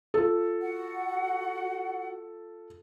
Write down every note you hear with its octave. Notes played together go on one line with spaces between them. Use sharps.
F4 A4
F#4 F#5